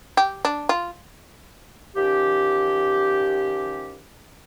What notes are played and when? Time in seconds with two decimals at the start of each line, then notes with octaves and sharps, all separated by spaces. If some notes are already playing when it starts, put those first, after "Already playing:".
0.17 G4
0.45 D4
0.69 F4
1.96 D#3 F3 C#4 G4